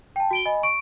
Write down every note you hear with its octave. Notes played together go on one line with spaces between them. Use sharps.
G5 A5
F#4 D7 G7
D#5 G#5 B5
C#6 D7